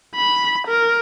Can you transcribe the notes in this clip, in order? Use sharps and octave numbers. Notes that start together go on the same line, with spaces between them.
B5
A#4